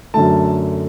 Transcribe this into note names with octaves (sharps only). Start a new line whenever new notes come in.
F#2 D3 A3 A5